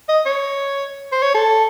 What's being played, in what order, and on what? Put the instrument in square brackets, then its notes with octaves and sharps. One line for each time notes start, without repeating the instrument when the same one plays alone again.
[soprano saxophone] D#5
C#5
C5
C#5
A4